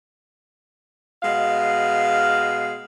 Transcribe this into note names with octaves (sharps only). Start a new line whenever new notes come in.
B2 G#3 F5